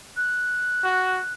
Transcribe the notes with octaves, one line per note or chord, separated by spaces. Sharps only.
F#6
F#4